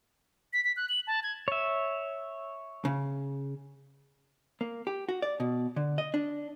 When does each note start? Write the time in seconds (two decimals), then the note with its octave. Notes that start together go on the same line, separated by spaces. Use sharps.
0.53 B6
0.65 B6
0.77 F#6
0.89 F#7
1.07 A5
1.23 G#6
1.48 C#5 E5
2.85 C#3
4.61 A#3
4.87 G4
5.09 F#4
5.22 D5
5.40 B2
5.76 D3
5.98 D#5
6.14 D4